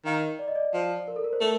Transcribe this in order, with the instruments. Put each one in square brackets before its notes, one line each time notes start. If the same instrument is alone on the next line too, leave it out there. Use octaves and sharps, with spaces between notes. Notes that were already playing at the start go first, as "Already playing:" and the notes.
[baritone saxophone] D#3 [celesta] F5
[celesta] D5
D#5
D5
[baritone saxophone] F3
[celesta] A#4
A4
A#4
C5
[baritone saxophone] A3 [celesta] A#4